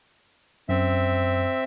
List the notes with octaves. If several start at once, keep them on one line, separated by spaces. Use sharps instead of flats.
F#2 C4 E5